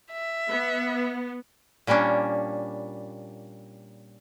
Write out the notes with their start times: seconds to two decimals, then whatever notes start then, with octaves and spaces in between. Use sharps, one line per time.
0.12 E5
0.50 B3
1.87 A#2 G3 A#3 C#4 D4